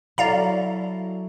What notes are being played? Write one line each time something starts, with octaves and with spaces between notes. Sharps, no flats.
F#3 E4 A4 D5 F5 A#5